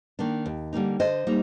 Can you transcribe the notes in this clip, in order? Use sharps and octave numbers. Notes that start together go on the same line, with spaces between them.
D#3 A#3 D4
D#2
D3 G3 A#3 D#4
D3 C5 D#5
G3 A#3 D#4